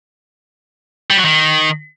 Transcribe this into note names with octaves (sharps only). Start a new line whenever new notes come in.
G3
F#3
D#3